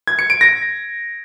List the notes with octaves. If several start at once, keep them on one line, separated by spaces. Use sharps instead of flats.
G#6
C#7
D7
A#6